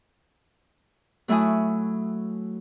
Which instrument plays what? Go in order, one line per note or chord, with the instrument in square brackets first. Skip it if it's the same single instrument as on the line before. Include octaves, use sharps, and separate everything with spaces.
[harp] F#3 A3 E4 F#4 G#5 D#6